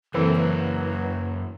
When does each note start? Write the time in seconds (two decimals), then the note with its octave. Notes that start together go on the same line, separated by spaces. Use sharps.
0.14 F#2 E3 A#3 C4 A4
0.36 F#3 B4